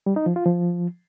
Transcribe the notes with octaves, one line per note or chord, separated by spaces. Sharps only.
G3
D#4
F3
F4
F3